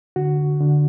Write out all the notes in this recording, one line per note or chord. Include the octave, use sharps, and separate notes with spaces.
D3 F#4
D3